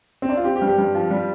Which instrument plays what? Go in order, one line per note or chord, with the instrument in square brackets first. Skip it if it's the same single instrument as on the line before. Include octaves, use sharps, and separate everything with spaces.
[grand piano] C4
D4
F4
[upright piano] C4 [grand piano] G4
[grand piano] G4
[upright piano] G2
[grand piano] G4
[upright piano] G2
F3
G3